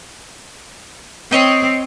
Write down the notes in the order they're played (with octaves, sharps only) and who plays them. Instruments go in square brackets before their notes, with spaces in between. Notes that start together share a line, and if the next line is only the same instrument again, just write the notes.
[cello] C4 [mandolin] C#5 D#5 G5